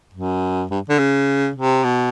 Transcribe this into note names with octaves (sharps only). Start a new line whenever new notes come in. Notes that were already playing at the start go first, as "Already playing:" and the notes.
F#2
G2
D3
C#3
C3
B2